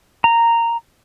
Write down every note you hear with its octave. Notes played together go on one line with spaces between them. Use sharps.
A#5